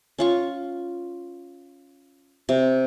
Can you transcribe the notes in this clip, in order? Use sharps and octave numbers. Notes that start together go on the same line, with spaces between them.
C#4 F4 C#6
C3